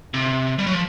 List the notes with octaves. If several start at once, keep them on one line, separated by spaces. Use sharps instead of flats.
C3
G3
F#3
F3